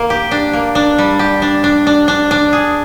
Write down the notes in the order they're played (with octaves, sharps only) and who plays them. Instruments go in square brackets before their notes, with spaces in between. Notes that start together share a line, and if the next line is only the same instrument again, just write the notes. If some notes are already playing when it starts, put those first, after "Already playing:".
Already playing: [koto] A#3
G4
D4
A#3
D4
G3
G4
D4
D4
D4
D4
D4
G#4